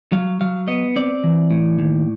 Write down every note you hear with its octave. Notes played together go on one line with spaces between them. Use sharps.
F#3 F5
F#3 F5
B3 D#5
C4 D5
E3
A2
D#2